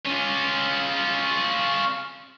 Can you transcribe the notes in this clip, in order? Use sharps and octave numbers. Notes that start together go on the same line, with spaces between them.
C#4 F4